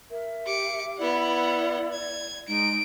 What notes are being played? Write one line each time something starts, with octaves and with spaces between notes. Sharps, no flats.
A#4 E5
G4 D6 C#7
B3 E4 D5 F#5
G#6
G#3 D#4 D7